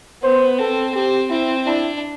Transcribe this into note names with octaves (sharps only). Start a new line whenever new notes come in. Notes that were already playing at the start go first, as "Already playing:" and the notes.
B3 C5
C4 A4
C4 G4
C4 E4
D4 E4